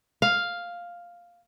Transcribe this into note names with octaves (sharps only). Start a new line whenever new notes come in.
F5